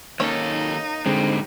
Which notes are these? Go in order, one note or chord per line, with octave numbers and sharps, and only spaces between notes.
D#2 A#3 C#4 D#4 A4 C#5
G#2 D3 G3 G#3 C4